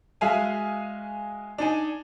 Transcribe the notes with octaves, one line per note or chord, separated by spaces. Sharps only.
G#3 F#4 G#4 E5 F5 G#5
D4 D#4 G#5